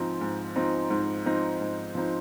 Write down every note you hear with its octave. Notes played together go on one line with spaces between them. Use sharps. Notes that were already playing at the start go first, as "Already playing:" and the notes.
Already playing: G#2 F3 C4 D#4
G#2
F3 C4 D#4
G#2
F3 C4 D#4
G#2
F3 C4 D#4